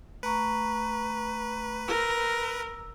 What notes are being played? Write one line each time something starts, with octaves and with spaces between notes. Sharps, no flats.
A3 B4 A#5 C#6
A#4 E6